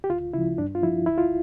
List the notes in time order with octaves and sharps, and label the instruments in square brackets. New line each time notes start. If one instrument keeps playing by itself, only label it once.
[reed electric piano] G4
D2 F4
C#3 F3 E4
G2 D4
F4
F3 E4
D2 E4
F4